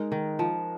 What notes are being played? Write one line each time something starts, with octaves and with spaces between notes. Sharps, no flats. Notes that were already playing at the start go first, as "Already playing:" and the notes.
Already playing: G#3 D#4 A#4
D#3
F3